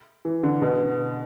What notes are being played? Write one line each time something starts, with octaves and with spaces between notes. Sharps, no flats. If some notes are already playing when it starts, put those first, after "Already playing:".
E3
D3
B2